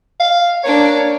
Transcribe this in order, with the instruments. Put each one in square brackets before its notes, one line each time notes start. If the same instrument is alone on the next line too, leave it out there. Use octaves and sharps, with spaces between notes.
[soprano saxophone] F5
[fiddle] A#3 D4 [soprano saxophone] C#5